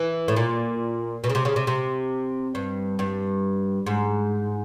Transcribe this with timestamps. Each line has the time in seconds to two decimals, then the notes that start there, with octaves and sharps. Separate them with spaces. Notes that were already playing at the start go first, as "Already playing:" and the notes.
Already playing: E3
0.28 A2
0.36 A#2
1.24 B2
1.30 C#3
1.35 C3
1.45 C#3
1.56 C3
1.67 C3
2.55 G2
2.99 G2
3.87 G#2